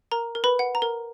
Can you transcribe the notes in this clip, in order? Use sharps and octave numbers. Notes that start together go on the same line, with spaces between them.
A#4 A#5
A#4
B4 B5
F#5
A#5
A#4